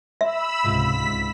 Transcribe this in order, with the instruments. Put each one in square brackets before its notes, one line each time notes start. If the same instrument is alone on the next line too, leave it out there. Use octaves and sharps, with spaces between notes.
[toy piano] E5 [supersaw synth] B5 E6
[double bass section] C#2 C3 [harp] G#2 F4 [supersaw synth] B6